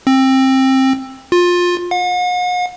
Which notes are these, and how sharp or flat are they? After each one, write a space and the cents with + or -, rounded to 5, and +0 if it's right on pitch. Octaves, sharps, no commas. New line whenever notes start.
C4 +20
F4 +20
F#5 -45